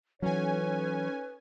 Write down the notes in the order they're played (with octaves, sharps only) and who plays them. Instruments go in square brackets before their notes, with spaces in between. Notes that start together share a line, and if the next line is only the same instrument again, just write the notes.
[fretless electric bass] E3 F#3 [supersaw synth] C#4 G#5 [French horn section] D#4 A4 C#5 [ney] B4